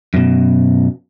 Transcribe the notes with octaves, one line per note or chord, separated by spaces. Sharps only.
F#2 B2